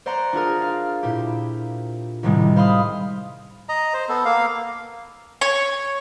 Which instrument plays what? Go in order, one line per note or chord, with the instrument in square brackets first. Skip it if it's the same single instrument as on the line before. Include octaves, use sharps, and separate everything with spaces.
[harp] C5 D5 F#5 A#5 C6
D4 F4 G#4 A#4
F5
A#2 E4 G4
C2 A2 C3 D#3 G3 G#3
C5 F5 B5 C6 D#6
[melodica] D#5 A#5
C5
B3 A4
A#3 F5
[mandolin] C#5